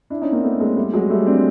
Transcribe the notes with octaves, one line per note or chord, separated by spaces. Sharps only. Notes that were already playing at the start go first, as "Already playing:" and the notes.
D4 E4
C#4 D#4
A#3 C4
A3 B3
G#3 A#3
G3 A3
F#3 G#3
G3 A3
C4 D4